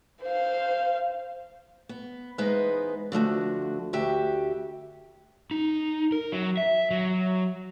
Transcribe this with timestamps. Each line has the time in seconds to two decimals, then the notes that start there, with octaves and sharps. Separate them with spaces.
0.23 C5 F5
1.89 B3
2.38 E3 G#3 B3 D#4 B4 C5
3.12 D3 F3 A3 F#4
3.93 D2 F#4 G4 E5
5.51 D#4
6.12 A#4
6.32 F#3
6.57 E5
6.91 F#3